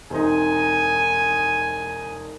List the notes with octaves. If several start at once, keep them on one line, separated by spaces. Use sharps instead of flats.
E1 C4 D#4 G#5